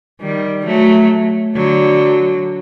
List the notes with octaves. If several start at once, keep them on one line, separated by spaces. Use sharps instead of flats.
D#3 G3
F#3 A3
D3 F#3